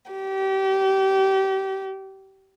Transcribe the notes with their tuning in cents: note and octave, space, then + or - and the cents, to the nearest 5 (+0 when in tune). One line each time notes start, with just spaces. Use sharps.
G4 -30